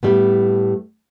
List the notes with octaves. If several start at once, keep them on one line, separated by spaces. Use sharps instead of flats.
A2 G3 A3 B3